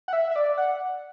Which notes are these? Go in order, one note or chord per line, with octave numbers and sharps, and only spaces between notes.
F#5
E5
E5
D5
F#5